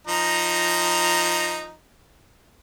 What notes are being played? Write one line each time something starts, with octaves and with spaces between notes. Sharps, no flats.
F3 D#4 A#5